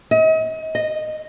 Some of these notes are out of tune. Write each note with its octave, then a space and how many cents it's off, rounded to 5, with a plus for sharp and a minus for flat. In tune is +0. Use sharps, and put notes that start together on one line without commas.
D#5 +40
D#5 -10